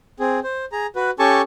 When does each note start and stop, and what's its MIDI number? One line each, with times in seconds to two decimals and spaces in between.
0.20 0.40 60
0.20 0.40 68
0.43 0.65 72
0.72 0.87 68
0.72 0.87 82
0.96 1.11 66
0.96 1.11 71
1.19 1.42 61
1.19 1.42 67
1.19 1.42 69
1.19 1.42 80
1.19 1.42 81
1.19 1.42 85